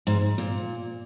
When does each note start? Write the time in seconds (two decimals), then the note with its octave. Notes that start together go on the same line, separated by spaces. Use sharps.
0.07 G#2
0.38 A#2